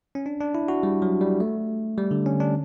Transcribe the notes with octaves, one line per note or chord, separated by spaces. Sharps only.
C#4
D4
D4
E4
F#4
G3
F#3
G3
A3
G3
D3
C#4
D4